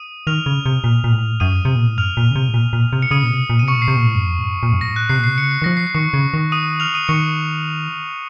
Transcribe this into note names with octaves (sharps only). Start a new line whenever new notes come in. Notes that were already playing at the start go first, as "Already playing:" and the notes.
Already playing: D#6 D#7
D#3 F6 F7
C#3
C3
A#2
A#2
A2
F#2 D#6 D#7
C3
A#2
A2
F#2 F6 F7
A#2
C#3
C3
A2
A#2
A#2
C3
C#7
C#3 D#6 D#7
A#2
C3
A#2
C3 D#7
C#6 C#7
A#2
C7
C3
A#2
A2
F#2
F2
A2
F#2
A#2
F#2
A2 A#6
F#6
C3 C7
A#2
C3 C7
C#3 C#7
C7
D#3 F3 A#6
C7
C7
D#3 C#6 C#7
C#3
D#3
D#6 D#7
F6 F7
D#6 D#7
D#3 C#6 C#7